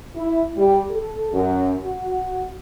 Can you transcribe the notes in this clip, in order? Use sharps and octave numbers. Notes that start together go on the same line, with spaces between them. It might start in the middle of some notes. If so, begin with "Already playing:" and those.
E4
G3
A4
F#2
F#4